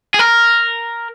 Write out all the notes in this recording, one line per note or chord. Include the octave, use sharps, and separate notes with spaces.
G#4
A#4